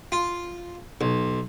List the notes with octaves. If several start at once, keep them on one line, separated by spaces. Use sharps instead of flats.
F4
B1